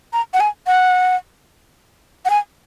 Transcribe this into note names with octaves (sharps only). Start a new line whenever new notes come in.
A#5
F#5
G#5
F#5
F#5
G#5